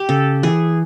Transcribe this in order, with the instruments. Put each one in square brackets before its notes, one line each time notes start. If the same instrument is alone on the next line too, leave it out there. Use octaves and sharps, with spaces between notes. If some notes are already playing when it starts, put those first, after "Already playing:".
Already playing: [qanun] G4
[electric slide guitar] C#3 [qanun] A4
[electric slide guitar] E3 [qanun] G#4